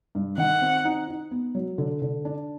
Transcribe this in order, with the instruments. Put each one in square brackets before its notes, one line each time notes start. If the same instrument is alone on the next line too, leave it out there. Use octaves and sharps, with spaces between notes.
[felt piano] G2
[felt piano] D#3 [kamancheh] F#5
[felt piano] C4
D#4
D#4
B3
F#3
D3
D3
D4